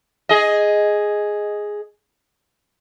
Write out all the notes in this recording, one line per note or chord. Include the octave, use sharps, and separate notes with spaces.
G#4 D#5